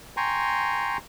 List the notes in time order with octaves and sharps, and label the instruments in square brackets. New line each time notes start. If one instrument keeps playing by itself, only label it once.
[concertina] G5 G#5 A#5 C6 C#6